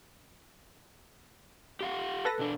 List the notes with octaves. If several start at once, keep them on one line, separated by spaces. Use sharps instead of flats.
G4 F5 F#5
A4 B4 A#6
B2 D4